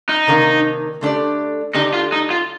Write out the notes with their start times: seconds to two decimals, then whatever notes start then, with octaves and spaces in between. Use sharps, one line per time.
0.09 D#4
0.27 C3 D#3 A#3 D4
1.01 D3 A3 D4 G4 D5
1.74 D3 A3 D4 D#4 G4 D5
1.94 F4
2.12 D#4
2.30 F4